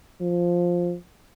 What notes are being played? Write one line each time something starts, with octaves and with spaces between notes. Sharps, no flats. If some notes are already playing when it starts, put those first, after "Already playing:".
F3